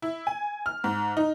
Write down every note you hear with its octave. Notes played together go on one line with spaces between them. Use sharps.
E4
G#5
F6
G#2
D#4